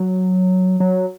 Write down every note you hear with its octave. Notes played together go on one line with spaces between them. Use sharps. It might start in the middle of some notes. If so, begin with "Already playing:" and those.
Already playing: F#3
F#3